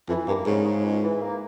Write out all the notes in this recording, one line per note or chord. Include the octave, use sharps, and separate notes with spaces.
F2 E3
G2 A#3
G#2 C#3
C#3
C#2
E3
A#3